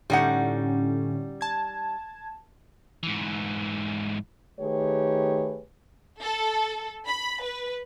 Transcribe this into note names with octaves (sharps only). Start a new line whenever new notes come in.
A2 D3 G3 C#4 D#4 F#5
A5 G#6
G#2 E3
D#3 A3 G4 G#4 B4 C#5
A4
B5
B4